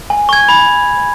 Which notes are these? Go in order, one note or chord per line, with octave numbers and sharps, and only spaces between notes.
G#5
C#6 G#6
B5